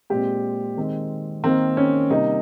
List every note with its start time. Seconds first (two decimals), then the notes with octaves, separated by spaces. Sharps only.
0.10 A#2 G#3 C4 G4
0.77 D#3 G#3 C4
1.44 D#3 A#3 C4
1.77 C#4
2.10 C3 G3 A#3 D#4